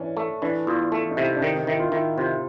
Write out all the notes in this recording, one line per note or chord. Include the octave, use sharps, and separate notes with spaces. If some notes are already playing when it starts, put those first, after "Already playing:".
Already playing: E3 C#4 D4
A3
E3 D4
E2 F4
A3
D#4
C3 E4
D4
D#3 D#4
D#4
D#3 E4
F4
D#3 E4
C3 F4